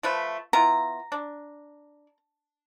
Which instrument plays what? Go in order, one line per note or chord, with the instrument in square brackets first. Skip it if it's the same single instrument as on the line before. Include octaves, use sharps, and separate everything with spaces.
[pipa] F3 A3 B4
[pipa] B3 E4 F4 [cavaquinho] A#5
[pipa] D4